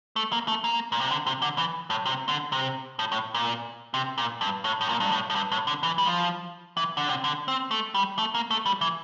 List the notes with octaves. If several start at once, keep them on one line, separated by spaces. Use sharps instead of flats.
A3
A#3
A3
A#3
A#2
C3
D3
C3
D3
E3
A2
C3
D3
C3
A2
A2
A#2
C3
A#2
G2
A2
A2
A#2
G2
A2
A2
G2
A2
D3
E3
G3
F3
E3
D3
C3
D3
C4
A3
G3
A3
A#3
A3
G3
E3